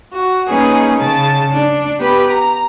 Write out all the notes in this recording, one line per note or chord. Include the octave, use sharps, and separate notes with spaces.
F#4
A#3 C#4 D#4 G#4 B4
C#3 A5
D4
B3 G4 B4 B5
A#5